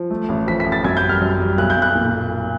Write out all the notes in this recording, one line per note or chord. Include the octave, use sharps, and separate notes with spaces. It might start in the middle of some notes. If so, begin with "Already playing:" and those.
Already playing: F3
A3
A1
F3 B6
B6
A1
A6
F#2 G#6
G6
G3
F6
F#2
G3
B1 F#6
G6
B1
F#6
A#2